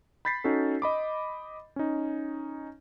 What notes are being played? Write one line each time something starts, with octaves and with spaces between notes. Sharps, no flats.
B5 G6 A6 B6 C7
C#4 D#4 F#4 A4
D#5 B5 D6
C#4 D#4